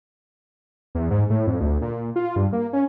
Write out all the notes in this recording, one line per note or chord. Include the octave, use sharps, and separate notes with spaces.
E2
G#2
A2
F2
D2
A#2
F4
G2
A#3
C#4